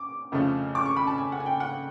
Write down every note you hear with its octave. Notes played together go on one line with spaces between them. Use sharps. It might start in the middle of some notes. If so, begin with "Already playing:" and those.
Already playing: D6
F2 C#3 F3 A3
D6
C#6
B5
A5
G#5
F#5
G#5
G5
F#5